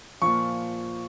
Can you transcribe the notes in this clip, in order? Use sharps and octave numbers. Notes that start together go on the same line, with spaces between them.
A#2 F3 C#6